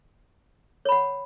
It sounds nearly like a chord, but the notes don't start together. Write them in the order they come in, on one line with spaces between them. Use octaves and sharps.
C#5 B5 F#5